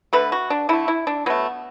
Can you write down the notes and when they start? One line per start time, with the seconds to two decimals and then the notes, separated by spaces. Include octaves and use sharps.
0.13 D3 A3 B4
0.32 F#4
0.50 D4
0.69 D3 A3 E4
0.88 E4
1.07 D4
1.26 B2 F#3 A3 B3